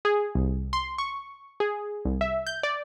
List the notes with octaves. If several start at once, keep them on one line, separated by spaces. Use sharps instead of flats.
G#4
C2
C6
C#6
G#4
C2
E5
G6
D5